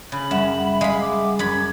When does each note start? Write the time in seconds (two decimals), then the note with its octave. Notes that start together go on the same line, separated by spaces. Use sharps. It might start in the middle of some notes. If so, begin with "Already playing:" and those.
0.12 C#3 B5
0.31 F#2 G3 E5 F#5
0.81 G#3 F5 B5
1.00 D6
1.39 F#2 B5 G#6